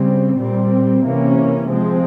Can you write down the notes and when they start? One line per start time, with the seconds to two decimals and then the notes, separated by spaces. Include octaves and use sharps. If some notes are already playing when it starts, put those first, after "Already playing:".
Already playing: C#3 G3 C4
0.38 A#2 G3 C4
1.04 C3 E3 A#3 C#4
1.70 F3 G#3 C4